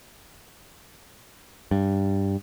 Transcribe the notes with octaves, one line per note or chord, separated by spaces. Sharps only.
G2